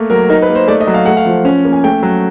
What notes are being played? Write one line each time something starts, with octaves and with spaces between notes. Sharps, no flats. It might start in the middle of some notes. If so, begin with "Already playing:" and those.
Already playing: A3 A#3
F#3 A#4
D#4 A#4
B4
A#3
C5
A3 D5
D#5
F#3
F5
A3 F#5
F5
F3
C#4
A#3
G#5
A3 G5
F#3